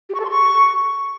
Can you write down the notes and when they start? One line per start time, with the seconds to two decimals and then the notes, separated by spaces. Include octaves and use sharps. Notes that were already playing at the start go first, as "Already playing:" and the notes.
0.09 G4
0.15 C#6
0.20 A4
0.25 C6
0.30 C#6